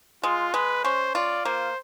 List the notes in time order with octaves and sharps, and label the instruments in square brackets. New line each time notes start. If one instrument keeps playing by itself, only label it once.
[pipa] G#3 [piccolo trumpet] F4
[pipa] G#3 [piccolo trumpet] B4
[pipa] C#4 [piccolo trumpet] C5
[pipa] F4 [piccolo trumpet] D5
[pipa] A#3 [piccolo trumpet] C5